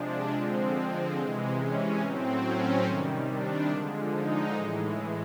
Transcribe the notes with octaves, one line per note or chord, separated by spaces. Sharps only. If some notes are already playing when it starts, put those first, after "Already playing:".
Already playing: C3 F3 G#3 D4
D3 F3 G#3 C4
C3 E3 G#3
C#4
A2 F#3 C4
C#4
C3 D#3 G3
D4
D3 F3 G#3
D#4
A2 E3 G#3